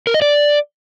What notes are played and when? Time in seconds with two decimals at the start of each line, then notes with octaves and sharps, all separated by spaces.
0.07 A#4
0.14 D#5
0.22 D5